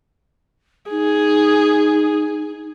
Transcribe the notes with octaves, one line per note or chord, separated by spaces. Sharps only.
D#4 G#4